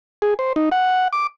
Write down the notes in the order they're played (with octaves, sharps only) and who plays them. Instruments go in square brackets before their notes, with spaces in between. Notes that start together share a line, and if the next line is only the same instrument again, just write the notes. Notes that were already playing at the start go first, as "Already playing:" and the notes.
[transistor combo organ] G#4
C5
D#4
F#5
D6